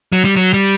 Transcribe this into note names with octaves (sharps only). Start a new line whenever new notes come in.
F#3
G3
F#3
G3